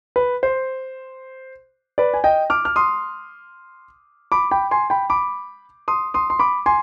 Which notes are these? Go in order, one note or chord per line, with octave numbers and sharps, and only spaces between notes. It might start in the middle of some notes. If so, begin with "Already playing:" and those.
B4
C5
B4 D5
G#5
D#5 G5
D6 F6
F6
C6 D#6
B5 D6
G5 B5
G#5 C6
G5 B5
B5 D6
C6 D#6
C6 D#6
C6
B5 D6
G#5 C6